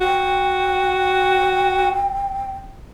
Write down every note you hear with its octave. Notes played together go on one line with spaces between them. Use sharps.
F#4 G5